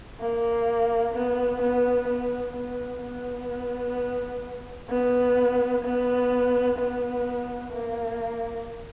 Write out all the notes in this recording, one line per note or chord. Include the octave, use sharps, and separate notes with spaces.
A#3
B3
B3
B3
B3
B3
B3
B3
B3
A#3